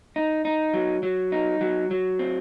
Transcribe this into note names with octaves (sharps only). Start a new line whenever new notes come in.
D#4
D#4
F#3
F#3
D#4
F#3
F#3
C4